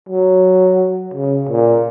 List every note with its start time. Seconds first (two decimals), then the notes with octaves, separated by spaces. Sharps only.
0.09 F#3
1.14 C#3
1.49 A#2